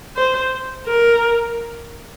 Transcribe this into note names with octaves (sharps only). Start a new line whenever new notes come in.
C5
A#4